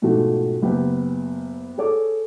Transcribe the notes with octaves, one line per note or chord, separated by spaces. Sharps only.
G#2 B2 F3 A3 F#4 G4
F#1 B3 G4
G#4 A4 C#5 D6